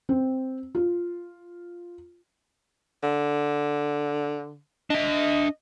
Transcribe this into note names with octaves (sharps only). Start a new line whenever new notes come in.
C4
F4
D3
D4 D#5 E5